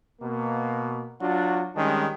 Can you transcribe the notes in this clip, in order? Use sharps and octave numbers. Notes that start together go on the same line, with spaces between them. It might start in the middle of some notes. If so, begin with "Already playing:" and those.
B2 A#3
F#3 D4 F4 F#4
D#3 G3 G#3 C#4 D4